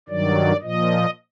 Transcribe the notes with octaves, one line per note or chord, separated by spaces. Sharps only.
G2 D#3 F#3 D5
A#2 F3 D#5